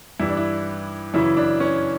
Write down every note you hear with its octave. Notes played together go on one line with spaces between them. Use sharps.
G2 E3 E4
D4
E4
F#2 C#3 E3 E4
D4
C#4